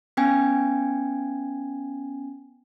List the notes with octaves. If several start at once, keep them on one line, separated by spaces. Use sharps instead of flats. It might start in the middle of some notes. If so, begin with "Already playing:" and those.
B3 C#4 G5 G#5 G#6